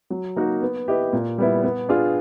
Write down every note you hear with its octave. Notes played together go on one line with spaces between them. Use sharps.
F#3
A#3 D#4 F#4 A#4
B3
E4 G4 B4 D#5
A#2
G3 B3 E4
B3
D4 F4 G#4